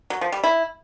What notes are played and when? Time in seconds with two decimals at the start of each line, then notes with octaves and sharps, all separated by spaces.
0.10 F#3
0.21 F3
0.32 G3
0.44 E4